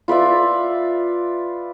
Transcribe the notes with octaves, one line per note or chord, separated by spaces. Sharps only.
F4 B4 D5 E5